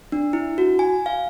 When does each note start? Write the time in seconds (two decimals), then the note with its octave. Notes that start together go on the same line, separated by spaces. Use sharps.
0.12 D4
0.33 E4
0.58 F#4
0.79 G#5
1.06 F5